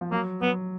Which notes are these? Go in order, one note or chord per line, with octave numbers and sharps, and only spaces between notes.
F3
F#3 A#3
F#3 B3